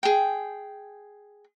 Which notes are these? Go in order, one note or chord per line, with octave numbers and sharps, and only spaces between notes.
G#4 G5